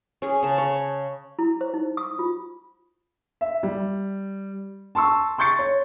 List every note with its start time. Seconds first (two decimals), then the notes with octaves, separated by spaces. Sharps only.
0.22 C#4 G#4
0.43 C#3 A5
0.58 C#5
1.39 E4
1.61 C5
1.74 D#4
1.97 D#6
2.19 F4
3.41 E5
3.63 G3
4.95 A5 C6 C#6 E6
5.38 C6 C#6 G6 A6 C#7
5.59 C#5